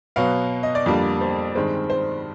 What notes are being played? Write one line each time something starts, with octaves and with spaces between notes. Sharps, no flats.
B2 F#3 B3 F5
D#5
D5
F2 D3 G3 A#3
C5
G2 D#3 G#3 C4
C5